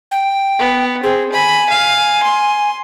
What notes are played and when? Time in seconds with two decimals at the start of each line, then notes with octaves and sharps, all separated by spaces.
0.11 G5
0.59 B3
1.03 C4 G#4
1.33 G#5 B5
1.70 F5
2.23 C6